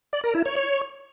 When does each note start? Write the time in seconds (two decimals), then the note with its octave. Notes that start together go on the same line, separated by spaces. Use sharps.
0.13 D5
0.24 A#4
0.35 E4
0.46 C#5
0.56 C#5